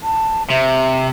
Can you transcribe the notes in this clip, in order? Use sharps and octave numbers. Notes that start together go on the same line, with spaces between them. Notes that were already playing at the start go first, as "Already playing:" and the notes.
A5
C3 E5